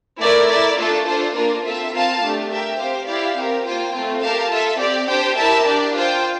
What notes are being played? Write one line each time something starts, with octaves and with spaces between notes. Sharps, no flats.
A3 E4 A#4 D5
E4 A#4 D5
A3 D4 F4 A4
D4 F4 A4 C5
A#3 D4 F4 A#4
C4 F4 A4 E5
C4 F4 A#4 F5 A5
A3 D4 G4
G4 A#4 E5 G5
C4 G4 C5 F5
E4 G4 D5 F5
C4 G4 A#4
A#3 F4 C5 G5
A3 C4 F4
G4 A#4 F5 A5
F4 A4 E5
C4 G4 D5
D4 G4 C5 G5
E4 G4 A#4 E5 A5
D4 G4 D5
F4 C5 G5